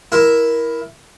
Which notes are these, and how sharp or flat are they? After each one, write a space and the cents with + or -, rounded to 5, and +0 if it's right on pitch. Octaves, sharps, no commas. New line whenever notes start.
E4 +0 A#4 +15